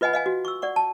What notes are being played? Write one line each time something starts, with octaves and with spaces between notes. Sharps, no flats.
F4 B4 D#5 F#5 G#5 B5
D#5 F5 G#5
F#4
C#6 E6
D5 F#5 C#6
A5